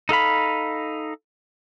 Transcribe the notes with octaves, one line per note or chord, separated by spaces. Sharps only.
D#4 A4 F5 B5